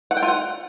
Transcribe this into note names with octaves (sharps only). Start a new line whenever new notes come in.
F#5
G5
F4
F#5